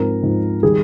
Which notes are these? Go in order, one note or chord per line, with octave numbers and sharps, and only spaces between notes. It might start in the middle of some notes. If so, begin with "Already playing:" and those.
Already playing: G#2 F3 C4 A#4
G#2 F3 C4
D#3 G3 G#4